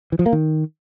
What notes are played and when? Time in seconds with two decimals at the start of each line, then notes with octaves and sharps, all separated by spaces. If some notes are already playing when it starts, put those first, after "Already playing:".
0.12 E3
0.19 F3
0.26 A#3
0.33 D#3